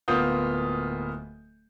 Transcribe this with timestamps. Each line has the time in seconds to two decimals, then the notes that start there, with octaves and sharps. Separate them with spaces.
0.08 D1 A#3 B3 F4 D#6 G6